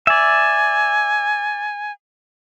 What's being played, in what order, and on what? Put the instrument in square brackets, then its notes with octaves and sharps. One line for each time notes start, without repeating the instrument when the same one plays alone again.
[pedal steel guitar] D5 E5 [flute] G#5